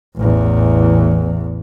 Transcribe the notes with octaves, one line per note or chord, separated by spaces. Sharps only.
A1 E2